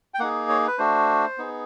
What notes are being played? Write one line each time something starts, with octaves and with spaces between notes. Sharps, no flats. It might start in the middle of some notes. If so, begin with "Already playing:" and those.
G5
A#3 D#4 G#4 F#5
C#5
B4
A3 D4 F#4 C5
B3 D#4 G#4